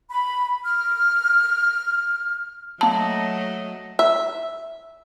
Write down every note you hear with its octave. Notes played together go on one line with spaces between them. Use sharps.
B5
F6
F#3 A3 A#3 D#5 A5 A#5
E5